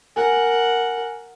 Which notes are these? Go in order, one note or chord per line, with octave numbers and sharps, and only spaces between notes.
A#4 F#5 G#5